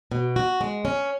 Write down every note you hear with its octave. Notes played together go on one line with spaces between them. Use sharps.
B2
F#4
G#3
C#4